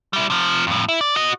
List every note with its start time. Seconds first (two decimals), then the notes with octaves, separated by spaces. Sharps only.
0.13 G3 E4
0.30 C3 F3
0.67 F2 A2
0.89 E4
1.01 D5
1.16 F#4 D#5